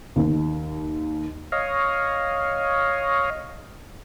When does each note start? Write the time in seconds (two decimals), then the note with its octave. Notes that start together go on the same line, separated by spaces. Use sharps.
0.16 D#2
1.52 C#5 D#5 F5